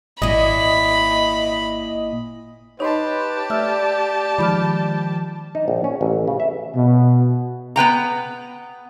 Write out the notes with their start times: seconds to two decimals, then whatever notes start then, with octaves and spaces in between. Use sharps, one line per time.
0.22 G#1 A#2 E4 D#5 B5
2.80 D#4 G4 B4 C#5 D#5 A5 B5 C6
3.50 A3 D5 E5 E6 F6
4.38 D#3 F3 G#3 B5 D6 F6
5.55 D#4
5.68 A#1
5.84 C#4
6.01 A1
6.28 C#3
6.40 E5
6.76 B2
7.76 B3 B4 G5 A#5